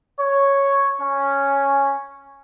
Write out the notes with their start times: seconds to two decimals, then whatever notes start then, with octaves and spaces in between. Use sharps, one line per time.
0.20 C#5
1.02 C#4